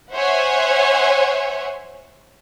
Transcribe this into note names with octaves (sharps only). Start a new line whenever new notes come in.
C5 C#5 E5 F#5 G#5